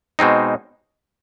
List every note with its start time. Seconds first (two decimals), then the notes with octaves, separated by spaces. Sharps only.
0.19 B2 G#3 C4 D#4